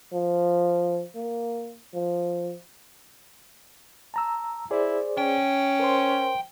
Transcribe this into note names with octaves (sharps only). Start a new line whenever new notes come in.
F3
A#3
F3
A5 A#5 E6
E4 G#4 C5 D5
C#4 G5
A#4 C5 C6